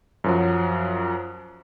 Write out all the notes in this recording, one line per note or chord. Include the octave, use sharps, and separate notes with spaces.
F#2 F3 F#3